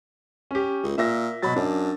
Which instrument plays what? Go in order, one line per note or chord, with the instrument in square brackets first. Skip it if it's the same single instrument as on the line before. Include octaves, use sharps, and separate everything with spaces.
[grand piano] C#4 G4
[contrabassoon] C#2
[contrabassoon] A#2 [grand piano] E5 E6 A#6
[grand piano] B2 B5 A6 [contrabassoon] F#3
[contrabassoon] F#2 [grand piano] D4